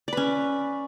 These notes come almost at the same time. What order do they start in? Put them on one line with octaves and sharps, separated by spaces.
D5 B4 C#4